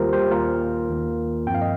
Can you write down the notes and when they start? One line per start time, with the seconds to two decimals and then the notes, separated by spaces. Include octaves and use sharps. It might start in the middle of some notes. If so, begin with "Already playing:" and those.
Already playing: D#2 D#3 G3 A#3 F4 G4 A#4 C5
0.13 G4 C5
0.31 D#2 D#3 A#3 F4 A#4
0.89 D#2 D#3 A#3
1.47 G2 F3 C4 G5
1.55 F5
1.62 D#5